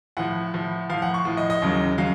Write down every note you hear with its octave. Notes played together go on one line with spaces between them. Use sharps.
A2 F3 F#5
A2 F3
A2 F3 F5
F#5
C#6
A2 F3
D#5
D#5
D#2 C#3 F#3
C#3 F#3 F5